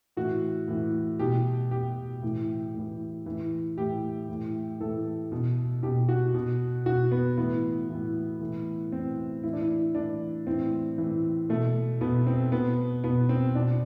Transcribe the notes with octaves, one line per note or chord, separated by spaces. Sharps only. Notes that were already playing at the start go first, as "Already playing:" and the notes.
A2 E3 F#4
A2 E3
B2 G4
B2 G4
A2 E3
A2 E3
A2 E3
A2 E3 G4
A2 E3
A2 E3 A4
B2
B2 G4
F#4
B2
B2 F#4
B3
A2 E3 B3
A2 E3
A2 E3
A2 E3 C4
A2 E3 E4
D4
E4
A2 E3 D4
A2 E3 C4
A2 E3
B2 A3
B2 B3
C4
B2 B3
B2 B3
C4
B2 D4